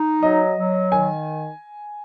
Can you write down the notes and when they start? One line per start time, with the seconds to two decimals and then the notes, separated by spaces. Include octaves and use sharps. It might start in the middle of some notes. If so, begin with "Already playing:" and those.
Already playing: D#4
0.23 F#3 D#5
0.57 F#3
0.91 D#3 G#5